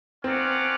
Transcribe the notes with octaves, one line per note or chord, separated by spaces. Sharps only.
C4 C#4 F4 A#4 D5 F#5